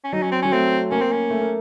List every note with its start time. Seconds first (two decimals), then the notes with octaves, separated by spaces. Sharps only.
0.04 C#4
0.13 F#3 D#4
0.22 C#4
0.32 C4
0.42 F#3 C#4
0.52 A3 C4
0.91 A#3 C#4
1.01 C4
1.11 C#4
1.30 A3
1.41 A#3